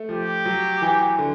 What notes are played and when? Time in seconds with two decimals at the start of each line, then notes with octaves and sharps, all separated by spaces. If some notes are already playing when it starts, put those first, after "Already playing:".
Already playing: A3
0.09 F3 G4
0.45 F#3
0.82 E3
1.19 D3